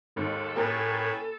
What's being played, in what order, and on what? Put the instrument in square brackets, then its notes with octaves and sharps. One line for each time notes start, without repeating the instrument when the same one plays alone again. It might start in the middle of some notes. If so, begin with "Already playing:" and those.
[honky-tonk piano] D#2 G#2 [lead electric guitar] A4
[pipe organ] A2 [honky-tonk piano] A#3 G4 A#4 [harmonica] C#4 G#4 B4